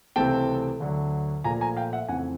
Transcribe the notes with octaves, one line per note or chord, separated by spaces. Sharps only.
C#2 C3 E3 A3 C4 G5 A5
D2 D3 F#3
A#2 F3 A3 G#5 A#5
G#5 A#5
F5 G5
E5 F#5
F2 C#3 E3 A3 C4 F#5 G#5